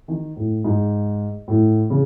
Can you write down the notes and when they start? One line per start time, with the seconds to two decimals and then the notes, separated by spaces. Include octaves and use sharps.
0.08 D#3
0.36 A2
0.65 G#2
1.48 A2
1.90 C#3